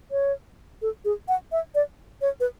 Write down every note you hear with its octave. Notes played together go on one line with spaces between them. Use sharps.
C#5
A4
G#4
F#5
E5
D5
C#5
B4